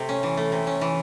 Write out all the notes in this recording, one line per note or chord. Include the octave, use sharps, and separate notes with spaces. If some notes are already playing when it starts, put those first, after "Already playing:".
Already playing: C3 A3
C#4
E3
A3
C3
C#4
E3